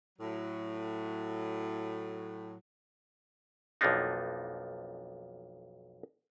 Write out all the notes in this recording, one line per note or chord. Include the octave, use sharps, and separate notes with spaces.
A2 F#3
B1 F2 F3 A#3 D4 D#4